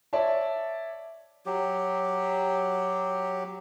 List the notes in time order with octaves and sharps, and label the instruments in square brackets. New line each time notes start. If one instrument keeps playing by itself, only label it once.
[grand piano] C#5 D5 E5 A5
[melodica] F#3 G4